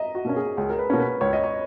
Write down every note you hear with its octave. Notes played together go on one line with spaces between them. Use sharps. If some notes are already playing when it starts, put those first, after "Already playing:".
Already playing: D#5 E5 A#5
F#4
B2 A#3 C#4
G#4
C#2 G#4
A#4
B4
B2 A#3 C#4
B4
C#2 C#5
D#5
C#5